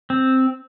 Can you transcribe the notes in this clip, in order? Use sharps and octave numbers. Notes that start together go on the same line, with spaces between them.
C4